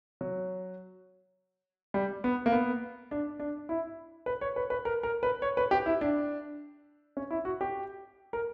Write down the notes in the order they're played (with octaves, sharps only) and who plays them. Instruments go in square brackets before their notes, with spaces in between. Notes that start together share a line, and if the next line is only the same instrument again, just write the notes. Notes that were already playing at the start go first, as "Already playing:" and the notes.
[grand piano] F#3
G3
B3
A#3
B3
D4
D4
E4
B4
C#5
B4
B4
A#4
A#4
B4
C#5
B4
G4
E4
D4
C#4
E4
F#4
G4
A#4